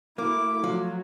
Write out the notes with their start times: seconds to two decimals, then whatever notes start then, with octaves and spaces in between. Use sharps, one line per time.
0.18 A3 A#3 E4 F#4 D6
0.64 F3 F#3